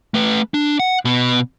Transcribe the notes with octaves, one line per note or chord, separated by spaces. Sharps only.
A3 B4
D4
F#5
B2 B3